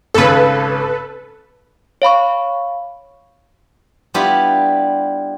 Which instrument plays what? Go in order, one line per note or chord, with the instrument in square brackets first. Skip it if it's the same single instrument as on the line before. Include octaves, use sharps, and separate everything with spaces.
[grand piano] G#1 C#3 [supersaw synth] A4 B4
[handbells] C#5 F5 B5 C#6
[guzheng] G3 B3 D4 E4 F4 G4